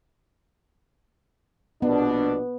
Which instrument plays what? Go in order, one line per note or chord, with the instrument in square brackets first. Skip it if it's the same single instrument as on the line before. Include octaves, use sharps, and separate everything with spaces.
[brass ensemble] A#1 B2 D4 [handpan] B3